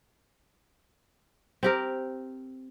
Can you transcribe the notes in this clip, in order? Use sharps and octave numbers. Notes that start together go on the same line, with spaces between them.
C4 G4 A#4